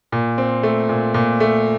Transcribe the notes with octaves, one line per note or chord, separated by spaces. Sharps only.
A#2
C4
A3
A#2
A#2
A3